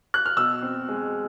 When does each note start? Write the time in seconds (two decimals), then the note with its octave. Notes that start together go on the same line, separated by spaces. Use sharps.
0.14 F#6
0.26 F6
0.37 B2 E6
0.62 C4
0.89 G#3